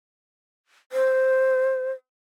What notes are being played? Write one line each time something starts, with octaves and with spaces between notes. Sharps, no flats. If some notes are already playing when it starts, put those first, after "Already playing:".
C5